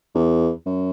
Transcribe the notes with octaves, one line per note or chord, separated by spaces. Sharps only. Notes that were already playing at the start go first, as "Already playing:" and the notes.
E2
F#2